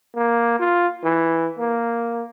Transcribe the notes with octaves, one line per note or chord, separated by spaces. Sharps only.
A#3
F4
E3
A#3